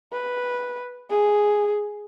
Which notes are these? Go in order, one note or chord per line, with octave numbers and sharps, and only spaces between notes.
B4
G#4